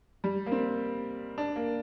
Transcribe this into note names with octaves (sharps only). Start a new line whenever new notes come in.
G3
A#3
C4
D4
A#3